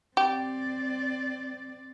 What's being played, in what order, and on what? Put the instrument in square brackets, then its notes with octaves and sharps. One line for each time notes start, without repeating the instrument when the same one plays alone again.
[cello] C4 D5 [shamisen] G4